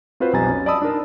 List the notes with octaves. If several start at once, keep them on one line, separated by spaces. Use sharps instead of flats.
C4 F4 F#4 B4 C5
B1 F2 G3 G#5 A#5 A6
C#4
D5 D#5 A5 B5 D#6 E6
D4 D#4 A#4